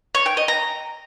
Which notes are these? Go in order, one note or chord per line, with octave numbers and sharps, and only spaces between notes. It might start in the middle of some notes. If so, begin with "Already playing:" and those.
C#5
G5
D#5
A#5